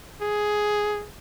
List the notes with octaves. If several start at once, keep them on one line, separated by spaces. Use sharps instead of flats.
G#4